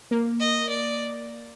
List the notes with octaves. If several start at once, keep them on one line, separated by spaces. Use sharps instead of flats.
A#3
D#5
D5